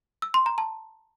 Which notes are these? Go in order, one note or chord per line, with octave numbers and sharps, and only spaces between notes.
E6
C6
A#5
A5